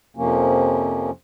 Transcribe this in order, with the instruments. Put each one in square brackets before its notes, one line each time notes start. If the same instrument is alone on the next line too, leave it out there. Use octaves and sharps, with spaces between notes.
[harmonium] F2 C3 F3 A#3 C#4